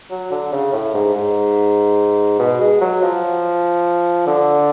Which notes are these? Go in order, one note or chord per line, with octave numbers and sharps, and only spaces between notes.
F#3
D3
C#3
A2
G#2
G#2
B2
G#3
F#3
F3
D3